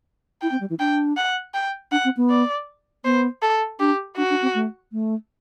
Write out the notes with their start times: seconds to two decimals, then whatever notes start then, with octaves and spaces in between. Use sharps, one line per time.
0.41 E4 G5
0.51 C4
0.60 G3
0.70 E3
0.79 D4 G5
1.17 F#5
1.54 G5
1.91 D4 F#5
2.04 C4
2.17 B3
2.30 D5
3.05 B3 C5
3.42 A4
3.80 D4 G4
4.17 D4 F#4
4.30 D4
4.42 C4
4.55 A3
4.92 A3